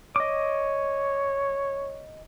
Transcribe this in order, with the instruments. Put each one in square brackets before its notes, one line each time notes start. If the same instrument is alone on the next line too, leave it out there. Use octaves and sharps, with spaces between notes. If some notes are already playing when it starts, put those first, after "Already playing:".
[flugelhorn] C#5 [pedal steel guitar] D#5 D6